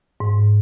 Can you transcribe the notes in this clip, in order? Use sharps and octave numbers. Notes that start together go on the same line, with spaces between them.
G#2